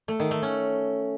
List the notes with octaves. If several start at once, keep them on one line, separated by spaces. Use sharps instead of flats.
A3
D#3
A3
C#4